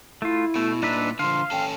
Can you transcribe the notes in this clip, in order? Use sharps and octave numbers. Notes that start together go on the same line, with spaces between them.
A3 E4 F4
B2 A3
A#2 D4 D#4 B4 E5
D3 F3 F5 C6
C#4 A4 G5